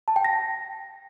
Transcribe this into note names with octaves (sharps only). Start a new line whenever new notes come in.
A5
G5
A#6